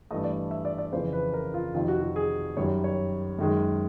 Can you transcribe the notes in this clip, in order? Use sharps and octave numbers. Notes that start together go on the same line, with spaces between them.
G2 E3 A3 D#5
D5
E5
D5
D5
F2 C#3 E3 C5
B4
A#4
F4
F2 C3 D#3 F4
F#4
F#4
G#4
F#2 D#3 G3 C#5
C#5
F#2 D#3 G#3